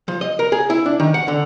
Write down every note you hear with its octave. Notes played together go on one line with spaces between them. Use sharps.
F3
D#5
A#4
G#4
E4
D4
D#3
F#5
D3